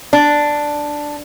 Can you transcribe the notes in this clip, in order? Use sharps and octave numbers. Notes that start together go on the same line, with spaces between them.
D4